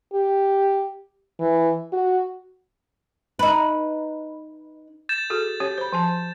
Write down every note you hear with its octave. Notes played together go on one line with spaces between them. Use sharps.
G4
E3
F#4
D#4 B4
G6 A6 E7
F#4 G#4 A4
C#4 G4 C#5
C5 B5
F3 G#5 A5